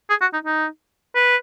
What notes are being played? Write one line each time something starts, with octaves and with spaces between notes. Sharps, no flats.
G#4
F#4
D#4
D#4
B4